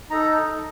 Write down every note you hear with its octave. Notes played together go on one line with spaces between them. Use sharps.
D#4 A4 A#5